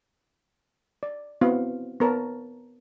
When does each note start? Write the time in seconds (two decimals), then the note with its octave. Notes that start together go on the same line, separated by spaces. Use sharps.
1.03 D5
1.41 B3 C4 E4 F#4 F5
2.00 B3 A#4 C#5 A5